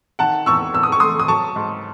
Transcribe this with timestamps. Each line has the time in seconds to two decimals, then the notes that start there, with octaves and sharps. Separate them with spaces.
0.19 D#3 F#5 A5
0.46 E2 C#6 E6
0.74 E2 E6
0.83 D#6
0.92 C#6
1.00 A3 C6 D#6
1.20 D#6
1.28 F#3 A5 C#6
1.56 G#2